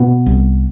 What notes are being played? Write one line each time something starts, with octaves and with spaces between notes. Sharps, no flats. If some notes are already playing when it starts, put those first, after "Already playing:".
Already playing: B2 B3
C2